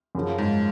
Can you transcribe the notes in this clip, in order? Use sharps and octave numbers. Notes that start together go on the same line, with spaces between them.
F#2 C#3 F3
G#2